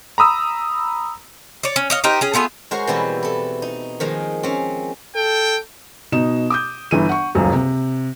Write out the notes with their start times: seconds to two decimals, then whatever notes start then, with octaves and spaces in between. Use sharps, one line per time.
0.18 A#5 B5 D#6 E6
1.63 C#5 D5
1.76 C#4
1.90 C#5 D#5 F5
2.04 D#4 G4 A#4 C5
2.21 C#4 G#4
2.34 A3 B3 F4 G#4
2.71 G#3 F#4 A#4 C5 C#5
2.87 B2 E3 G3 C4 E4 G4
3.23 E4 A4
3.62 D#4
4.00 D#3 F3 G#3 A#3
4.43 C4 C#4
5.15 A4 G5
6.12 B2 D#4 E7
6.50 D6 D#6 G6
6.91 G1 E3 D#7
7.09 F#5 C#6
7.35 D#1 C#2 F#2
7.53 C3